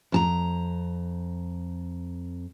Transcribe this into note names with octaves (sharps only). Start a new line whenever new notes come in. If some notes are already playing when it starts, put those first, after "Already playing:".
F2 A5 A#5